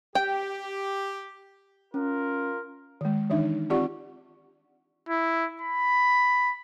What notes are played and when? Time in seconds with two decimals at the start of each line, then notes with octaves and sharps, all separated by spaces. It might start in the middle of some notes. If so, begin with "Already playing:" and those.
0.15 G4 G5
1.94 C#4 F4 A#4
3.01 D#3 G#3
3.30 D#3 E3 D4 D#4 E5
3.70 C4 F4 G4 D5 F#5 C#6
5.09 E4
5.62 B5